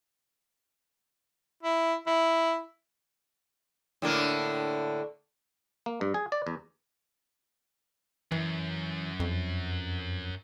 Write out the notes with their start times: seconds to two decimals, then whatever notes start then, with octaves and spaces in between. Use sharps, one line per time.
1.63 E4
2.07 E4
4.02 A2 D3 A#3
5.86 A#3
6.01 G2
6.14 G#4
6.32 D5
6.47 E2
8.32 F#2 E3
9.20 F2